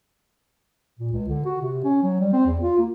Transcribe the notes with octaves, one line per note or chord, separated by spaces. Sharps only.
A#2
C#2
D3
F#4
C3
C#4
F#3
G3
C4
E2
F4
A#3